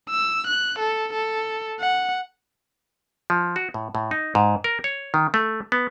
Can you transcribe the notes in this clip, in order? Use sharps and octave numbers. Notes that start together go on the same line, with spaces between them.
E6
F#6
A4
A4
F#5
F3
F#4
A2
A2
D#4
G#2
A#4
C#5
D#3
A3
B3